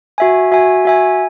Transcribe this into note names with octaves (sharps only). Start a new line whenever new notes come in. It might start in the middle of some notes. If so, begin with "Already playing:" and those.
F#4 E5 G#5
F#4 E5 G#5
F#4 E5 G#5